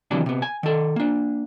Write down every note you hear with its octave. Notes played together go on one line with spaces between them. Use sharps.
C3 D#3 E3 F#3 B3 D4
C3 B3
G#5
D#3 A4
A#3 D4